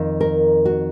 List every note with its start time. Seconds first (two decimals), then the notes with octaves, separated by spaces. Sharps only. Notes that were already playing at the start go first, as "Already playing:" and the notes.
Already playing: F2 D#3 A#3
0.21 A#4
0.65 F#4